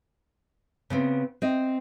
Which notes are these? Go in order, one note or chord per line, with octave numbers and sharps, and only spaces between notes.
C#3 B3 C4
C4 D#5